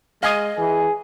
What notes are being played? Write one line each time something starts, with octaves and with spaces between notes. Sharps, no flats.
G#3 D#5 F5 G#5 D#6
E3 G#4